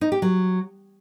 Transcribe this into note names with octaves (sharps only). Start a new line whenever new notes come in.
D#4
G4
F#3